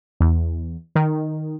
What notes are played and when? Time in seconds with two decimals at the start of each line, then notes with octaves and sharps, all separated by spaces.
0.20 E2
0.95 D#3